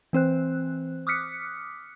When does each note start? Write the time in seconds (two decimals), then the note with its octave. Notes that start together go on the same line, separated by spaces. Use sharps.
0.13 E3 C4 C5 F#6
1.07 D6 D#6 F6 F#6 B6 C#7